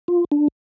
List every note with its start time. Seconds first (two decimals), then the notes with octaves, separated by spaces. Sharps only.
0.08 F4
0.32 D4